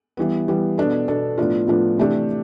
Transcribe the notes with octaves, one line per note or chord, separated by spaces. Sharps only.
E3 G3 B3
E3 G3 B3
B2 B3 D4 A4
B2 B3 D4 A4
A2 F3 B3 D4 F4
A2 F3 B3 D4 F4
C3 E3 A3 D4 G4